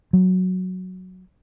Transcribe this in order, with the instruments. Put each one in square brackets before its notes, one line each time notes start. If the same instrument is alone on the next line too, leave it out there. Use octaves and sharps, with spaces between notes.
[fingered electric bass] F#3